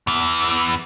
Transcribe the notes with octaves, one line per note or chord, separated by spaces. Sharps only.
E2 E3